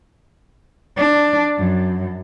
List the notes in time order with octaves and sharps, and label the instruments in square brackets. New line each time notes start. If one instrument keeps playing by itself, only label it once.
[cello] D4
F#2